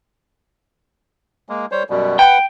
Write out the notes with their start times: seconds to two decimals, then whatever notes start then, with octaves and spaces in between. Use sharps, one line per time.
1.49 G#3 A#3
1.72 G3 C5 C#5
1.90 F#2 B2 G3
2.19 B4 F#5 G5